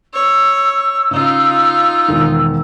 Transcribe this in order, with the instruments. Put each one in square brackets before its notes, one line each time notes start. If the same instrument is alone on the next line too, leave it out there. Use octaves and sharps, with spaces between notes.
[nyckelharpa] C#5 [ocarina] E6
[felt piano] C#3 [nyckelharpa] D#4 F4
[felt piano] E1 D#3